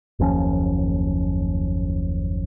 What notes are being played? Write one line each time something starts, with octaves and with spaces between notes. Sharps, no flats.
F#1 D#2 F3 C#4